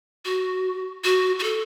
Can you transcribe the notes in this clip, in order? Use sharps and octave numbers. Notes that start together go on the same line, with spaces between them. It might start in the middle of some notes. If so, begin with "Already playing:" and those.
F#4
F#4
F#4
A4